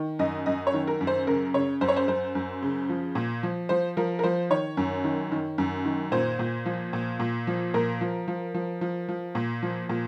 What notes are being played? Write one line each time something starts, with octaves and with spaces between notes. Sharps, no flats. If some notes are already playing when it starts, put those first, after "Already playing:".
Already playing: D#3
F#2 D#5
F#2 D#5
C#5
D#3
A#4
F#2
C5
C#3 A#4
C#3 C#5
F#2 C5
C#5
C5
F#2 C5
F#2
C#3
F3
A#2
F3
F3 C5
F3 A#4
A#4
F3 C5
D#3 C#5
F#2
D#3
D#3
F#2
D#3
A#2 C5
A#2
F3
A#2
A#2
F3
A#2 A#4
F3
F3
F3
F3
F3
A#2
F3
A#2